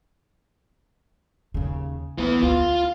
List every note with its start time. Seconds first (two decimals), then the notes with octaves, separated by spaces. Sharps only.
1.54 D#2 C#3
2.18 D2 E3 B3
2.43 D2 F4